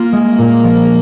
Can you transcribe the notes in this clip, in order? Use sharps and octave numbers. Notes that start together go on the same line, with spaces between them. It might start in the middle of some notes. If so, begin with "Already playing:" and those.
Already playing: A#3 F4
G#3
A#2
F3